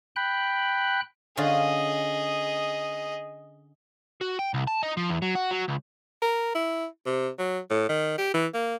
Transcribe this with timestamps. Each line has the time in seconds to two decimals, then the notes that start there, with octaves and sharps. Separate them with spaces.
0.16 G5 B5 F#6
1.37 D3 C#4 F4 G#4 D#5
4.21 F#4
4.39 G5
4.54 C2
4.67 A5
4.83 D#4
4.97 F3
5.09 E2
5.22 F#3
5.35 F#4
5.51 F#3
5.68 C#2
6.22 A#4
6.55 E4
7.06 C3
7.39 F#3
7.70 A2
7.89 D#3
8.18 G4
8.34 E3
8.54 A#3